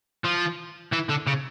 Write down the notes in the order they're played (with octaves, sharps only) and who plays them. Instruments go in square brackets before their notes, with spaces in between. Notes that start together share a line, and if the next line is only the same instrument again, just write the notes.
[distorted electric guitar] F3
E3
D3
C#3